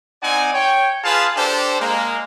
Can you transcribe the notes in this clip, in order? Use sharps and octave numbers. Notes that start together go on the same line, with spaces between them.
C4 D#4 D5 F#5 G#5
C#5 G5
F4 G#4 B4 F5 A5
D4 G4 A4 C5
G#3 A#3